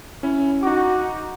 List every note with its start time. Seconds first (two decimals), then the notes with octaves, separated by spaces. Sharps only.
0.23 C#4 E4
0.63 D#4 F#4 D6